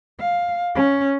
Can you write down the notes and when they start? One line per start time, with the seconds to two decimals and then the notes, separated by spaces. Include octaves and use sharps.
0.20 F5
0.75 C#4